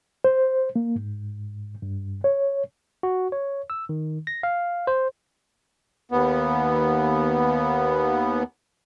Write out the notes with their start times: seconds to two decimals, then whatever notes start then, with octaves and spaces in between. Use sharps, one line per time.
0.24 C5
0.76 A#3
0.96 G#2
1.82 G2
2.24 C#5
3.03 F#4
3.32 C#5
3.70 E6
3.89 D#3
4.27 A#6
4.43 F5
4.87 C5
6.11 D#2 B3